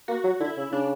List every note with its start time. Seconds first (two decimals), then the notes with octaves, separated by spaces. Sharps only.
0.08 A#3 F#4
0.24 F#3
0.40 D3 E4
0.57 C#3
0.72 C#3 D4